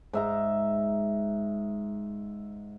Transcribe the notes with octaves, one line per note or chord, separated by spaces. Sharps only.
G#2 E5 A#5